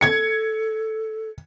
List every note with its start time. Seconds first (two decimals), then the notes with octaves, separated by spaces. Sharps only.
0.01 A4 G#6 C#7